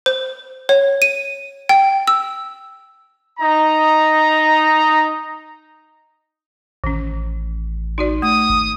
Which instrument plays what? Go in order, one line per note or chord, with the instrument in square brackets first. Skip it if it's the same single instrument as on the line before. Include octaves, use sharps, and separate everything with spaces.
[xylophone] C5
C#5
D#7
G5
E6
[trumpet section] D#4 A#5
[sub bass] A1 [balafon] D#3 C#4
[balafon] D#4 F#4 D5
[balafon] A3 [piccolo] D#6
[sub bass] G#1